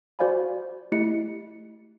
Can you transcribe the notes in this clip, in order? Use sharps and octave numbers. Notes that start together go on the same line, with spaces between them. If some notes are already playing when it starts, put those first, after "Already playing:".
F#4 C5 D5 F5 G#5 B5
A3 E4 G4 D#5 C#7